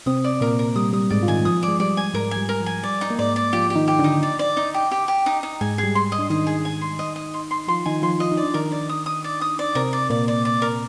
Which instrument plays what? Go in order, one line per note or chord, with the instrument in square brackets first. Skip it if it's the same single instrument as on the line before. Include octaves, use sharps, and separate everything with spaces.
[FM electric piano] C3 C4 [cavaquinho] D#6
[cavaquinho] D5
[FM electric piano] A#2 A#3 [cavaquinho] A#4
[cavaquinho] A#4
[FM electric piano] G3 [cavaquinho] D#6
[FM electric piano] G3 [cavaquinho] D#6
[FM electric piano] G#2 G#3 [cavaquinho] D5
[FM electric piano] F4
[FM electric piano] D#3 D#4 [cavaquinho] G#5
[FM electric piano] F3 [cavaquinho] D#6
[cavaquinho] D5
[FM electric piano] G#3
[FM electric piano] G3 [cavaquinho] D5
[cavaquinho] G#5
[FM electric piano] G#2 G#3 [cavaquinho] A#4
[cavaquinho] G#5
[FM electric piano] G3
[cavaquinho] A#4
[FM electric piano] F3
[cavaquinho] G#5
[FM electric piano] G3 [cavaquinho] D5
[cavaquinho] D#4
[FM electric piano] A#3
[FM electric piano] G#2 G#3 [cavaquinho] D5
[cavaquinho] D5
[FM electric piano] F3 F4 [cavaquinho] G4
[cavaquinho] G4
[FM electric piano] D#3 D#4
[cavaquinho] G4
[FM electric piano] D3 D4
[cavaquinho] D#4
D5
D5
D#4
G4
G4
G4
D#4
D#4
[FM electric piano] G#2 G#3 [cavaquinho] G#5
[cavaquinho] G#4
[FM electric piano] G3
[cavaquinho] C6
D#5
[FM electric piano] D4
[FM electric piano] D#3 D#4 [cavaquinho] D#5
[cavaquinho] G#4
G#5
C6
D#5
D#5
C6
C6
[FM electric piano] F3 F4 [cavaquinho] C6
[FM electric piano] D#3 D#4 [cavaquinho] G#5
[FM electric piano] F3 F4 [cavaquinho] C6
[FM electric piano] F4 [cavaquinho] D#5
[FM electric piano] D#4
[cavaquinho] D5
[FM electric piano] D4
[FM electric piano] D#3 D#4 [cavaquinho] A#4
[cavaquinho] D5
D#6
D#6
D5
D#6
D5
[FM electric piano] C3 C4 [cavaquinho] A#4
[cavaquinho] D5
[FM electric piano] A#2 A#3 [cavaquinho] D5
[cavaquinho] D5
D5
A#4